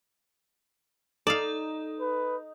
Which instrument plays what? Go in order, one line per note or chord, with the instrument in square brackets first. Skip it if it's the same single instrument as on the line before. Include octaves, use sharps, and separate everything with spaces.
[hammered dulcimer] D#4 [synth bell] A4 [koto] D5 F5
[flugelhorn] B4